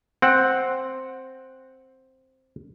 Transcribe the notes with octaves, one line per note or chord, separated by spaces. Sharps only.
C4 F#5